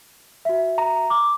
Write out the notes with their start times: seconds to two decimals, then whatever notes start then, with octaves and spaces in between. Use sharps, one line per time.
0.45 F#4 E5
0.78 A#5
1.10 D6